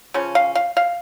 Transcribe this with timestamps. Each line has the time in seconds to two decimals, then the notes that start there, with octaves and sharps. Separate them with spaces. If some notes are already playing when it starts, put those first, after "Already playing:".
0.14 C#3 F3 C#4
0.35 F5
0.55 F5
0.77 F5